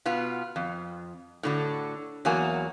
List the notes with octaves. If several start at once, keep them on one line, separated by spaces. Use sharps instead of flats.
B2 B3 F4
F2
A2 D3 F#4
E2 F#3 A#3 F#4 G#5